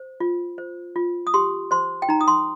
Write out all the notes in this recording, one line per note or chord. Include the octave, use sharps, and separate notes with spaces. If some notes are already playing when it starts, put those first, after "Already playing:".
Already playing: C5
F4
C5
F4
D#6
G4 C6
C5 C6
G5
D#4 A#5
D#6
C6